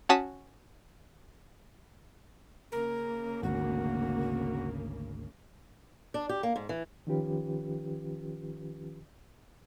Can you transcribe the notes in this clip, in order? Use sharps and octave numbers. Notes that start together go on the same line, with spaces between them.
C#4 F#4 A5 D#6 B6
C#3 A#3 A#4
G#1 D2 F#4
D4
G4
A#3
G#2
E3
D#3 F3 C#4 F4 G4 B4